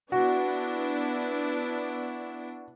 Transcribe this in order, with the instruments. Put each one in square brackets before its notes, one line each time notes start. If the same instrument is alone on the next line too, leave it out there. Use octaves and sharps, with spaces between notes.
[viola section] B3 D4 E4 [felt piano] F#4